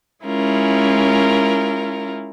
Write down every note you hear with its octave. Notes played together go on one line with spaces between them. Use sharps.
G#3 C#4 E4 F4 A#4